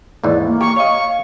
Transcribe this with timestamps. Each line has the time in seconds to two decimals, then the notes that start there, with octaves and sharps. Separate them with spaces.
0.23 D#2 G#2 E3 D5
0.46 A#3
0.61 G4 C#6
0.76 C#5 D#5 F5 C#6